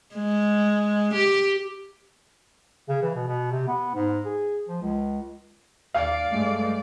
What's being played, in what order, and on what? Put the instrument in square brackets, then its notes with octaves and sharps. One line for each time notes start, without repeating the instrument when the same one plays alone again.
[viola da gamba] G#3
G4
[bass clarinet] C#3
E3
B2
B2
C3
B3
G#2
G#4
F3
C#2
[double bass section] D#2 [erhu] D5 [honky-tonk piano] F5
[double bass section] G2 G#3 A3